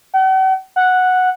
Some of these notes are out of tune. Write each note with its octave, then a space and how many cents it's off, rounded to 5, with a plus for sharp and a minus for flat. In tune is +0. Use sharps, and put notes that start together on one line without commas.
F#5 +45
F#5 -5